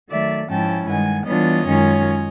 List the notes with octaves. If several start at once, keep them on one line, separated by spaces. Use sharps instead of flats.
D#3 F#3 A3 D5 E5
G#2 F3 G#3 C#4 E4 G5 A5
G2 D#3 G#3 F#5 G#5
E3 G3 B3 D4 F4 C#5 D#5
F#2 D#3 G#3 C#4 F4